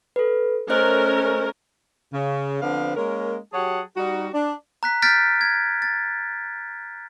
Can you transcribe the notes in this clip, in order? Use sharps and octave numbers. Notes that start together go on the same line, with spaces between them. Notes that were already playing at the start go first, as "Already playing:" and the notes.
A4 B4
A3 C#4 A#4 C5 D#5 F#6
C#3
D3 F3 B3 C4 D4 F5
G#3 A#3 C#4 A#4
F#3 G4 G#4 C#5 F#5 A5
G3 D#4 F#4
D4
A#5 F#6 B6
F6 G6 A6 B6 D7
G#6
A6